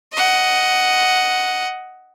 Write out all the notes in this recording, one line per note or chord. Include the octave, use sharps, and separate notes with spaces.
D#5 F#5